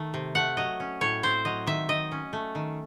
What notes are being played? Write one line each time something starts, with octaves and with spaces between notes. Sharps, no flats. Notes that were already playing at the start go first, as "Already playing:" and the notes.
Already playing: D#3 A3
C3
A3 F#5
F#3 D#5
C#4
A2 C#5
C4 C5
F#3 D#5
D#3 E5
D#3 D#5
C#4
A3
D#3